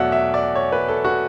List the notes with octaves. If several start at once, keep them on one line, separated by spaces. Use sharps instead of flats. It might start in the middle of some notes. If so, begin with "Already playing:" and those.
Already playing: E2 B2 F#3 A3 D5 E5 F#5
E5
D5
C#5
B4
A4
F#4